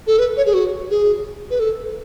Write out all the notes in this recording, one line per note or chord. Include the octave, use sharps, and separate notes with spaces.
A4
B4
C#5
G#4
F#4
G#4
B4
A4